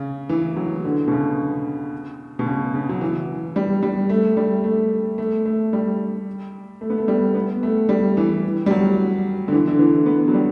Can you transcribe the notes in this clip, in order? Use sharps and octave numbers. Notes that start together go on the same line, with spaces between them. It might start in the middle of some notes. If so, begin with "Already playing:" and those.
Already playing: C#3
E3
F#3
D3
B2
C#3
B2
C#3
C#3
F#3
E3
G3
G3
A3
G3
A3
A3
A3
G3
A3
B3
A3
G3
B3
A3
G3
E3
G3
F#3
D3
E3
D3
E3
B3
F#3
G3